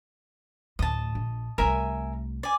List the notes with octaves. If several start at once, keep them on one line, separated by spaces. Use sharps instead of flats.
D2 A2 D#5 A5
A#1
C2 A3 A#4 E5 G#5
D5 G#5